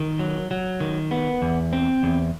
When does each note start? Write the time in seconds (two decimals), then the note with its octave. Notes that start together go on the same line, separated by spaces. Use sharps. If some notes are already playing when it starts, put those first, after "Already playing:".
Already playing: D#3
0.19 F#3
0.51 F#3
0.80 D#3
1.11 B3
1.42 E2
1.73 C4
2.03 E2